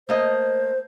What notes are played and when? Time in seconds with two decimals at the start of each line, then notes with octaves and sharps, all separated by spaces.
0.09 A3 A#3 C5 D#5